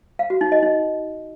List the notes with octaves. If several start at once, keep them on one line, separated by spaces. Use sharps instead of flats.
F5
F#4
D#4
D#5
D#4